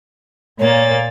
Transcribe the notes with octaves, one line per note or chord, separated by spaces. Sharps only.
A#2 A#3 C#5 A6